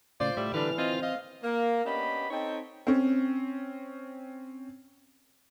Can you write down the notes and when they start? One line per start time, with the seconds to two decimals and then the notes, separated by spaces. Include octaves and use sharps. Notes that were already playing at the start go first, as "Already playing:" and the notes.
0.20 A2 C#3 F4 C5 D5
0.37 A2 G3 D5 E5
0.54 D3 E3 D4 B4 F6
0.78 C4 F4 D#5
1.02 D#5 F5
1.43 A#3
1.85 B3 C#4 D4 G4 D#5 B5
2.30 C4 D#4 A4 C#5 D#5 G5
2.87 C4 C#4